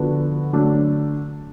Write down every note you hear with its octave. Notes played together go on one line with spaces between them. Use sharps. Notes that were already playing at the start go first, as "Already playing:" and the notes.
Already playing: D3 F3 B3 D4 F#4
D3 F#3 A3 D4